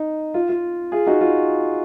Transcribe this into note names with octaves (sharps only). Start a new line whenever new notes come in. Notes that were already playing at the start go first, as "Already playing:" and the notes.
Already playing: D#4
F4
F4
F4 G#4
D#4 F#4
F4